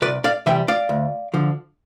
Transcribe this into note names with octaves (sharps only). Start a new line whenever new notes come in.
C2 B4 D5
D5 F5
C3 E3 G3 E5 G5
D5 F5
D2
D3 F3